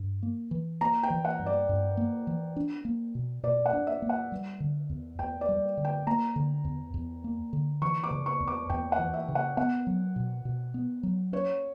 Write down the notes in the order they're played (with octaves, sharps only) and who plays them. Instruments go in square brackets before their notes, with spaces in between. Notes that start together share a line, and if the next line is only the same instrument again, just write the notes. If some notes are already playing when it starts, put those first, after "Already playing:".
Already playing: [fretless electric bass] G2
A#3
E3
[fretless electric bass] A#3 [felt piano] A#5
[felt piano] G5
[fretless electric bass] E3
[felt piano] F#5
[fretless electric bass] G2
[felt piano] D5
[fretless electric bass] G2
A#3
E3
D4
A#3
B2
[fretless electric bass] B2 [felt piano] D5
[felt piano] F#5
[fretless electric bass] D4
[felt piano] E5
[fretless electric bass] A#3
[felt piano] F#5
[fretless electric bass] G3
D3
E2
[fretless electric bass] E2 [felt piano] G5
[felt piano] D5
[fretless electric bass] G3
D3
[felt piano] G5
[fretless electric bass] A#3 [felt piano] A#5
[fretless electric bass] D3
E2
E2
A#3
D3
[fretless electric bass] E3 [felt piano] C#6
[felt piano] D6
[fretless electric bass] C#3
[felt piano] C#6
[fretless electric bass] E2
[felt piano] D6
[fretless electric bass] E2 [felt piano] G5
[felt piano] F#5
[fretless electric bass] E3
[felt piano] E5
[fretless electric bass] C#3
[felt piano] F#5
[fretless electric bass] B3 [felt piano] F#5
[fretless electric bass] F#3
B2
B2
B3
F#3
[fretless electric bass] C#4 [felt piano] C#5